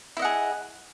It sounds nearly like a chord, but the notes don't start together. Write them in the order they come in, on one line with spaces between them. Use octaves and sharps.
E4 D#5 F#5 G#4